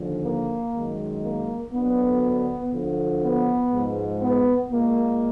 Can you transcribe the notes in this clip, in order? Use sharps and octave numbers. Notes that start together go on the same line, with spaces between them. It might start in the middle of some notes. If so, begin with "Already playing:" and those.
Already playing: D#2 D3 F3
A#3
F#2 D#3 G#3
A#3
D2 D3 F#3 B3
D2 D3 F3
B3
G#2 F3 G#3
B3
A#2 G#3 A#3